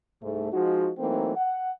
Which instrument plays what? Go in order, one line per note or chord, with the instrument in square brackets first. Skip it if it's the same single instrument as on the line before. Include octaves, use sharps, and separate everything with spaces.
[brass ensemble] C2 G#2 A3
F3 G#3 D#4 F#4
E3 F#3 A3 A#3 C4 D#4
F#5